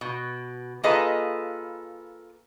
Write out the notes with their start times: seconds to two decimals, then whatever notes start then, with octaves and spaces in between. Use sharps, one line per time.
0.01 B2
0.83 A#3 F4 G#4 A4 B4 D#5